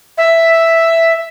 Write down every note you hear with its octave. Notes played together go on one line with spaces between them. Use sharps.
E5